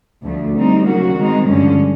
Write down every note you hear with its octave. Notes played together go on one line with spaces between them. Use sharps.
D2 D3 F3 A3
G3 C4 D#4
C#3 F#3 A#3 C#4 F#4
D#3 G#3 C4 D#4
G2 D3 F3 G#3 C#4